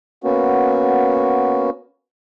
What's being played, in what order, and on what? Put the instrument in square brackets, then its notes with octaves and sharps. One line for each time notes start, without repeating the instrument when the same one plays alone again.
[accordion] A#3 B3 C#4 F#4